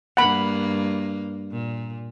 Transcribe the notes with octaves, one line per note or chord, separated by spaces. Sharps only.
G2 A#3 F#5 B5
A#2